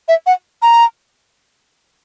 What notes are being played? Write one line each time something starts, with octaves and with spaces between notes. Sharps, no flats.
E5
F#5
A#5